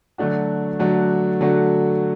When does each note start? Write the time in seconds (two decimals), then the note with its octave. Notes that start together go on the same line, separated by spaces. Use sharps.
0.18 D3 F#3 A3 D4 F#4
0.79 D3 F#3 A3 D4 F#4
1.41 D3 F#3 A3 D4 F#4